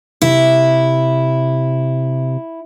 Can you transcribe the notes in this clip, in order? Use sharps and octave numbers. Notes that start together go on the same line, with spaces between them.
C3 E4